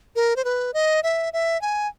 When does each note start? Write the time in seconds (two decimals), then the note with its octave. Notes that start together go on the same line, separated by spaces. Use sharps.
0.16 A#4
0.36 C5
0.45 B4
0.74 D#5
1.03 E5
1.33 E5
1.62 G#5